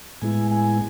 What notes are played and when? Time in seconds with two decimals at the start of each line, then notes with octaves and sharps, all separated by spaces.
0.22 A2 G#3 B3 E4 G#5
0.51 G#5